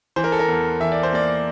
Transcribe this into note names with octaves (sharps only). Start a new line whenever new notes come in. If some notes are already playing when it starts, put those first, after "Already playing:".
E3 C5
A#4
A4
A#4
E2
E3 E5
D5
C5
A#3 D5